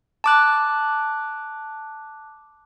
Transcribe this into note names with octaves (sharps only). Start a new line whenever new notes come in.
A5 D6 F#6